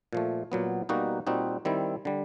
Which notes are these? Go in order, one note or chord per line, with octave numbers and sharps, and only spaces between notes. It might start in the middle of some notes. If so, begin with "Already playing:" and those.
A#2 F3 A3
A#2 F#3 B3
B2 G3 A#3 D#4 F#4
A#2 G3 C4 D#4 F#4
D#3 G3 C4 E4
D3 G3